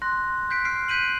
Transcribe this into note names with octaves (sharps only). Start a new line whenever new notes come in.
C6 F#6 A#6
F#6 G6 B6 C7 D7
F6 C7 D7
F#6 G6 B6 D#7 F#7